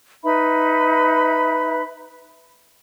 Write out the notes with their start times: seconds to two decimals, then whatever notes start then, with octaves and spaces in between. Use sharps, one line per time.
0.24 D#4 B4 E5 B5